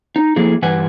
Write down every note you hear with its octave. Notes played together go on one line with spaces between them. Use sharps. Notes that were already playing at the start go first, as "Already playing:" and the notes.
D#4
F3 A3 A#3 E4 G#4
G2 E3 G4 B4 F#5 G#5